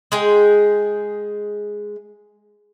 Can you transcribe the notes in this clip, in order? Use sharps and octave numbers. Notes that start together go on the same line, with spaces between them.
G#3 G#4 G5